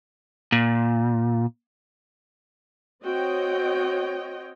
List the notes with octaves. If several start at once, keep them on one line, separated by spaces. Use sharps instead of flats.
A#2
C4 F#4 C#5 D#5 G5